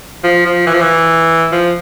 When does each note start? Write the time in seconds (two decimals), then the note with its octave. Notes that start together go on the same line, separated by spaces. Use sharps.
0.24 F3
0.46 F3
0.67 E3
0.74 F3
0.81 E3
1.52 F3